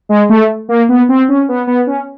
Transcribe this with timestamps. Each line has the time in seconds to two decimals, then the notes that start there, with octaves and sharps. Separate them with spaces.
0.09 G#3
0.29 A3
0.69 A#3
0.89 B3
1.09 C4
1.29 C#4
1.49 B3
1.67 B3
1.87 C#4